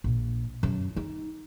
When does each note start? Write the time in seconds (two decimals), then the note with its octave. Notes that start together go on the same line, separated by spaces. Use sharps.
0.04 A#1
0.63 F#2
0.96 D#4